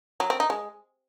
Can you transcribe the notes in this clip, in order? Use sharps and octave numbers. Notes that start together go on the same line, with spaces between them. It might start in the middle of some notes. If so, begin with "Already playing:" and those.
F#3
C4
D#4
G#3